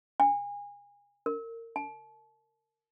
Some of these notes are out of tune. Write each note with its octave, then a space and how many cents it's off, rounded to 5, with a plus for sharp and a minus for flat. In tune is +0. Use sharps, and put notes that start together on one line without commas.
G#5 -30
A#4 -25
A5 -35